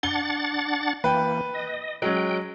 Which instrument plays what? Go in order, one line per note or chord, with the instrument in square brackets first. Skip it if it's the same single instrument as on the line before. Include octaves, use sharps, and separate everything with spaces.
[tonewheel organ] D4 F#5 A6 [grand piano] G7
[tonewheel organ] E3 A#3 [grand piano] B4 G5
[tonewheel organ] D#5
[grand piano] F#3 G#3 C#4 [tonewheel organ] G5